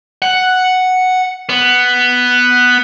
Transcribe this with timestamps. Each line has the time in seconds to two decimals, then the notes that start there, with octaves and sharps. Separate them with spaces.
0.22 F#5
1.49 B3